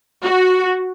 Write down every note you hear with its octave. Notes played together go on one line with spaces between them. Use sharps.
F#4